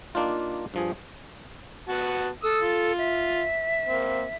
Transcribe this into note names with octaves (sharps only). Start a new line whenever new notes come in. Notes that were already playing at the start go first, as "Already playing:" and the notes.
A#3 D4 D#4 F4
G2 F3 G#4
B3 F#4 A5
A4 D#6 E6
F4
E5
A#3 C4